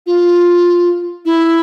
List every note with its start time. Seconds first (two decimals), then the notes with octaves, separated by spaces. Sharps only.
0.07 F4
1.25 E4